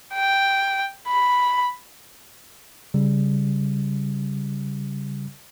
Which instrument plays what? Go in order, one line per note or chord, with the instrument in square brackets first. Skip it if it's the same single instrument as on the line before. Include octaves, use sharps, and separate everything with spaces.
[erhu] G5
B5
[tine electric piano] C#3 G3